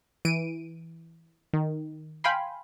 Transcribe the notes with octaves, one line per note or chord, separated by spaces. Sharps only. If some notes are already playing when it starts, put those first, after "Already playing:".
E3 D7 D#7
D#3
F5 G5 G#5 B5 C6